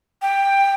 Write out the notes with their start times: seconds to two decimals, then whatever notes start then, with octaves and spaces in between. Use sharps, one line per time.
0.22 G5